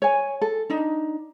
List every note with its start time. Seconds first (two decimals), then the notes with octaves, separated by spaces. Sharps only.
0.02 C#5 G#5
0.42 A4
0.70 D4 D#4